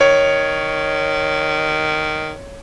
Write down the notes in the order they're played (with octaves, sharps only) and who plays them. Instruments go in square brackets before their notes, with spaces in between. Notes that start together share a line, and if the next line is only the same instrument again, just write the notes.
[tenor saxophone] D#3 [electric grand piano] C#5